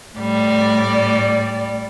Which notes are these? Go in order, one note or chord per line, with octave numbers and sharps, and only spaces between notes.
A2 G3 D5